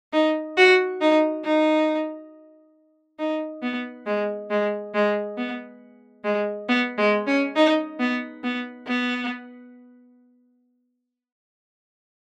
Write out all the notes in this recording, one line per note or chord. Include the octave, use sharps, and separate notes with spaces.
D#4
F#4
D#4
D#4
D#4
B3
G#3
G#3
G#3
B3
G#3
B3
G#3
C#4
D#4
B3
B3
B3